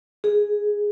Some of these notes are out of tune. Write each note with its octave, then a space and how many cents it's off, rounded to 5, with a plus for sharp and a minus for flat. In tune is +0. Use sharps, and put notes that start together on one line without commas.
G#4 +0